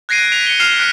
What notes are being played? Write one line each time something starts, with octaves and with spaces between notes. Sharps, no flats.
F#6 G#6 A#6 C7 D7 D#7
B6 D7 F7
C#7 G7
F6 C7 E7 F7
F6 F#6 B6 D7